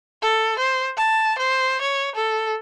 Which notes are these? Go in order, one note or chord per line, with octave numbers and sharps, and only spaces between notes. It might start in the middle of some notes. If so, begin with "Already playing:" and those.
A4
C5
A5
C5
C#5
A4